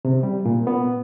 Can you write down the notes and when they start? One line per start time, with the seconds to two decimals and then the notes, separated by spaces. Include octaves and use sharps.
0.05 C3
0.23 G3
0.45 A#2
0.67 B3